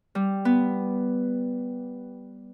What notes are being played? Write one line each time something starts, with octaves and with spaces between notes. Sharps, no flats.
G3
B3